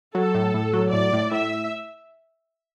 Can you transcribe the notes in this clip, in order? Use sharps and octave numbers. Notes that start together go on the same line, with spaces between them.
F#3 A4
A2
A2
F#3
A2 D5
A2
A2 E5